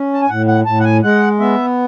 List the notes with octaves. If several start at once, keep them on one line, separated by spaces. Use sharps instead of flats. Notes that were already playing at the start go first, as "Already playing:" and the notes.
Already playing: C#4
A5
G#5
A2 F#5
F#5
A2 A5
F#5
G#5
G#3 F#5
B3 E5